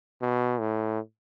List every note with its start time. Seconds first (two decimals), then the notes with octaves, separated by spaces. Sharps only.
0.22 B2
0.60 A2